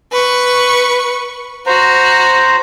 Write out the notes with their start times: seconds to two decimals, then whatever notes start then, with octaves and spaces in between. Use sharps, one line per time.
0.12 B4 C#6
1.67 F#4 C5 A#5